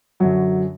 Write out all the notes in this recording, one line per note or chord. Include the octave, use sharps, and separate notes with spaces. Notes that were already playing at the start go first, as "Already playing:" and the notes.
F#2 D3 F#3